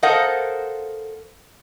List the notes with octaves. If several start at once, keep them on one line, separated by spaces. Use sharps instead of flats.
A4 A#4 C5 D#5 F5 F#5